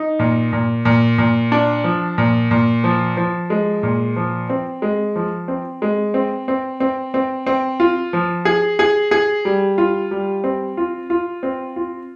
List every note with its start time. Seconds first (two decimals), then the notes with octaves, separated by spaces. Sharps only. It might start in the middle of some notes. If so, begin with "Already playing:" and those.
Already playing: D#4
0.19 A#2
0.53 A#2
0.85 A#2
1.18 A#2
1.52 D4
1.84 F3
2.18 A#2
2.51 A#2
2.84 F3
3.17 F3
3.50 G#3
3.83 A#2
4.16 F3
4.50 C4
4.82 G#3
5.16 F3
5.48 C4
5.82 G#3
6.14 C4
6.48 C4
6.80 C4
7.14 C4
7.47 C4
7.80 F4
8.13 F3
8.45 G#4
8.79 G#4
9.11 G#4
9.45 G3
9.78 F4
10.11 G3
10.44 C4
10.77 F4
11.10 F4
11.43 C4
11.76 F4